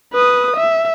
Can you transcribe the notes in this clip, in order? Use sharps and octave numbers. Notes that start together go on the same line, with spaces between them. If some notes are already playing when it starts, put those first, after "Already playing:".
B4 D#6
E5